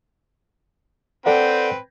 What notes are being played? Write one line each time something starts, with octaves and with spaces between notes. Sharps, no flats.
C4 A4 B4 D5 F#5 G5